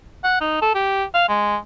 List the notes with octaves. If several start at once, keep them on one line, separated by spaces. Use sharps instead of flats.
F#5
D#4
A4
G4
F5
G#3